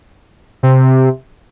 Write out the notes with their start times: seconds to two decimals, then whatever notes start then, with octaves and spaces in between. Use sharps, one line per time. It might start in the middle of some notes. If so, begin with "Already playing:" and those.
0.63 C3